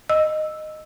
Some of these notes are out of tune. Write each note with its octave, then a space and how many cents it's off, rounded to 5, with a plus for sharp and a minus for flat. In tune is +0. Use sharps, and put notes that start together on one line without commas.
D#5 -10 E6 -5